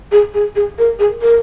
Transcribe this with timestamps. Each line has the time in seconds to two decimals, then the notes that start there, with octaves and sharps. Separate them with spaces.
0.12 G#4
0.34 G#4
0.56 G#4
0.78 A#4
0.99 G#4
1.21 A#4